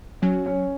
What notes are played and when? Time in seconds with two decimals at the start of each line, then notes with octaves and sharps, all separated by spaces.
0.22 F#3 C#4 C#5
0.46 C#4 C#5